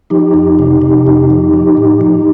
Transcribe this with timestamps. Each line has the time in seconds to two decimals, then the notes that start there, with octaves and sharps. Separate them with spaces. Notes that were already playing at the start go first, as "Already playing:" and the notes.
0.10 F3 D#4 G4
0.34 F2
0.59 C3
0.82 C3
1.07 F2
1.30 F3
1.53 F3
1.77 A2
2.01 F3